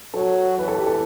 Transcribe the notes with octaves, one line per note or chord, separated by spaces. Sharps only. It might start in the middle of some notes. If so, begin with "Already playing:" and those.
F#3 A4
E3 B4
A4
G4
A4